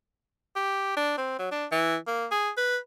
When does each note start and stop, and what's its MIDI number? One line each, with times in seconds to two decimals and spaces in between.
0.56 0.92 67
0.97 1.15 62
1.17 1.37 60
1.39 1.51 54
1.51 1.66 62
1.71 1.96 52
2.07 2.26 58
2.31 2.50 68
2.57 2.77 71